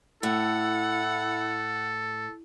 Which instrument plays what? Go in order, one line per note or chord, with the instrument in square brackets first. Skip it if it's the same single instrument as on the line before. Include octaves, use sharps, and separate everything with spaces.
[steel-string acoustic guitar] A2 [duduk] E4 [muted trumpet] A4 [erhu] F#5